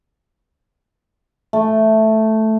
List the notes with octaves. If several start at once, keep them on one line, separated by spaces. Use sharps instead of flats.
A3